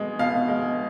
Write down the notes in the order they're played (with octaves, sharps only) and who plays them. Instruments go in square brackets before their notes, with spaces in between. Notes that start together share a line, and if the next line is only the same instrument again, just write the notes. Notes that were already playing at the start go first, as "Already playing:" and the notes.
Already playing: [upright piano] B2 G#3
B2 F5
G#3